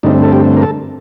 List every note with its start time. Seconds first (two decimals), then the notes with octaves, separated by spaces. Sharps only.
0.03 G2 D3 A3 C4 D#4
0.23 A4
0.33 G4
0.56 A#4
0.62 A4